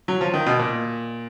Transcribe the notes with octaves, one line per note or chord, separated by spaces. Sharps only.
F#3
F3
D#3
B2
A#2